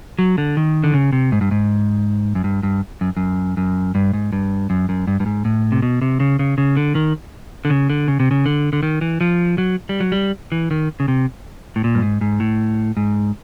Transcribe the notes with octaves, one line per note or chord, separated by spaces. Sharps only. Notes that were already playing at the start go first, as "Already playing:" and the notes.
F#3
D3
D#3
D3
C#3
C3
G#2
G2
G#2
F#2
G2
G2
F#2
F#2
F#2
G2
G#2
G2
F#2
F#2
G2
G2
G#2
A2
C3
B2
C3
C#3
C#3
C#3
D3
D#3
D3
C#3
D3
C#3
C3
C#3
D3
D3
D#3
E3
F3
F#3
G3
F#3
G3
E3
D#3
C#3
C3
A2
A#2
G2
G#2
G#2
A2
G#2